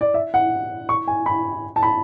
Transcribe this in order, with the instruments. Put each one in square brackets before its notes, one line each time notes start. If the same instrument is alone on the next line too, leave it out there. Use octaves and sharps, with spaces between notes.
[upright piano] D5
E5
F#5
C#6
G#5
B5
A5
B5